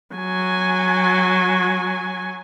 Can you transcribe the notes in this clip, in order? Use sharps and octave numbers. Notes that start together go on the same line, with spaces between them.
F#3 G#5